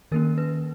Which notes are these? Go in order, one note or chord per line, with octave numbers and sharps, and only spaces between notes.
D#3 A#3 C#4 A#4
B4